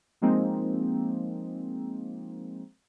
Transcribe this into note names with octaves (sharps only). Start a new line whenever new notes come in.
F3 G#3 A#3 C4 D#4